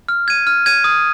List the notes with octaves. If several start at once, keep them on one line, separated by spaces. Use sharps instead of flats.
F6
G#6 D#7
F6
G#6 D#7
D#6